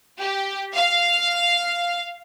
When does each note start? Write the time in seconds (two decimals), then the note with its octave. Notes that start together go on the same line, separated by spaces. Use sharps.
0.21 G4
0.75 F5